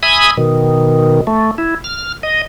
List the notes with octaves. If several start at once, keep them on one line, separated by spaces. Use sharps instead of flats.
E5 G#5 B5 D#6
B2 D#3
A3
E4
F6
D#5